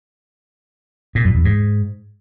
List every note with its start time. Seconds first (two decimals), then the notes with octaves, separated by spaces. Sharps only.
1.15 A#2
1.25 F#2
1.35 E2
1.45 G#2